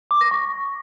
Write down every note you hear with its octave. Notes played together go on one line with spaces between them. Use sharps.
D6
A#6
C#6